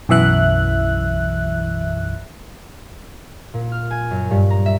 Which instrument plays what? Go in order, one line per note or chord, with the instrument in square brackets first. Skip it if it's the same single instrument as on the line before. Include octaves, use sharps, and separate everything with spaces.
[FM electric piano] B1 F#2 E3 E5 F#6
[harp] A#2
F6
G#5
F#2
G2
A#5
E5